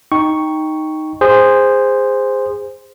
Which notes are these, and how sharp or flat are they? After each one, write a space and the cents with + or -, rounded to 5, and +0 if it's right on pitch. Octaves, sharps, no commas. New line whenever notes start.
D#4 +0 G5 +0 C#6 +0
G#4 -25 C5 -5